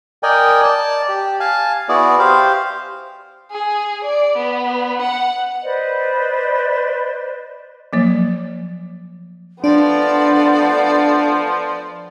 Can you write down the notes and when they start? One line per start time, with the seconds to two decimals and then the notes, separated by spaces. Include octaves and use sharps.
0.23 A#4 D5 D#5 G5 G#5
0.63 D5 A5
1.09 G4
1.40 F5 G#5 A5
1.89 B3 E4 F#4 G#4 D5
2.19 G4 C5 F5
3.51 G#4
4.04 D5
4.37 B3
5.02 F#5
5.64 B4 C5 D5 D#5
7.93 F3 F#3 A#3 C#5
9.64 F3 A3 B3 D4 D5